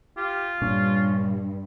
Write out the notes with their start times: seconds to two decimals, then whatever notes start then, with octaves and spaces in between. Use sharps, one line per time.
0.17 F4 G4
0.61 G2 A#2 C#4 D4